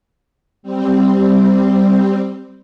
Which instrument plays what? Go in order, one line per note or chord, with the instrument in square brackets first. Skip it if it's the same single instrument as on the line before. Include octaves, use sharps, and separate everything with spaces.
[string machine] G3 C4